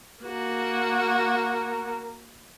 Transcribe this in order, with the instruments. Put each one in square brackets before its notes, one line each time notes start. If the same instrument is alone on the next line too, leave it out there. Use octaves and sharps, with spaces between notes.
[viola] A#3 F#4 [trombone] A#4